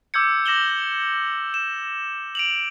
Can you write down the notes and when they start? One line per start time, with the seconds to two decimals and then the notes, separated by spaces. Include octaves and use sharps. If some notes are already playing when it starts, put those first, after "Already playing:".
0.14 D6 E6 G6 G#6 C#7
0.46 D6 A#6 E7 F#7 G7
1.54 E7
2.35 D7 F7 F#7